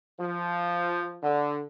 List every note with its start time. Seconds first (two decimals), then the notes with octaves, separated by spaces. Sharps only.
0.19 F3
1.22 D3